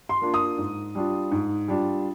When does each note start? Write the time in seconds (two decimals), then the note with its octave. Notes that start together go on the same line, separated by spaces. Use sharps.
0.09 C6
0.21 A#3 D4 F4
0.34 D#6
0.58 G#2
0.95 G3 D4 F4
1.31 G#2
1.68 G3 D4 F4